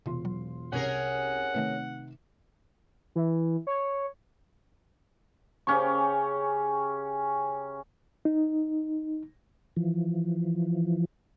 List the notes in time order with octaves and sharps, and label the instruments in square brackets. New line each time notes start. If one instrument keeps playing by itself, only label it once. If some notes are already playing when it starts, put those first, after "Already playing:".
[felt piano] E1 F4 C6 [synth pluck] C3
[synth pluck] F#3
[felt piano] C2 [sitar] C#4 G#4 A#4 [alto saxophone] F#5
[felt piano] C3 D#4 [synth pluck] D#3 A3 B4
[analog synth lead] E3
C#5
[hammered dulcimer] C#3 C#4 G4 C#6
[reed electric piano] D#4
[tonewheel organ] E3 F3